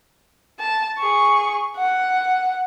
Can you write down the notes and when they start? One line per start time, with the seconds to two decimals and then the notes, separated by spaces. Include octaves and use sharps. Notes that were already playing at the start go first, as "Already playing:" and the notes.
0.59 A5
0.98 G#4 C#6
1.76 F#5